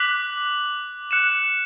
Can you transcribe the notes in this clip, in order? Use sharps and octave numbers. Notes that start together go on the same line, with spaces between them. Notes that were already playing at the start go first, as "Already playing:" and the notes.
Already playing: D6 F#6 B6 F#7
F#6 C#7 E7